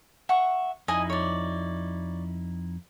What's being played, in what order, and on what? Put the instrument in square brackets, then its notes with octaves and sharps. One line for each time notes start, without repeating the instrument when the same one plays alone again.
[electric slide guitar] E5 [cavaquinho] F#5 C#6
[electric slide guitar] F2 D#4 E4 [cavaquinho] D#5 G#5
[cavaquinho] C#5 D5